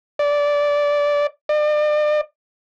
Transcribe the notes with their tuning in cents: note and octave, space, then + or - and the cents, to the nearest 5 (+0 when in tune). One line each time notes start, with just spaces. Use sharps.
D5 -15
D5 +40